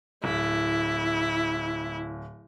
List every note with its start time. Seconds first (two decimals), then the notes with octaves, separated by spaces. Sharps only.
0.24 D1 E4